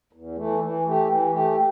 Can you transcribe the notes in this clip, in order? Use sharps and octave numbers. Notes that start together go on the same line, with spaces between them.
E2
E3 A3
E3
A3 G4
E3
A3 G4